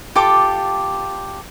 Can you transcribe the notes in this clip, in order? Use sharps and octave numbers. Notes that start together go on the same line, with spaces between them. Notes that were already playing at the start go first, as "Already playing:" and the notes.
F4 G4 A4 D6